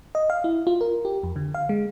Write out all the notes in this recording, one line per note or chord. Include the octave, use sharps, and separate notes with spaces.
D#5
F5
E4
F4
A#4
G4
F2
D3
F5
G#3